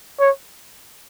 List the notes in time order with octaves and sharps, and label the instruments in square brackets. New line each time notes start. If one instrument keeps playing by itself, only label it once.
[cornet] C#5